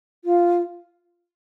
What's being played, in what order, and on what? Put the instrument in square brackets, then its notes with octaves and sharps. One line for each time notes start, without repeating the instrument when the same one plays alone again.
[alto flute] F4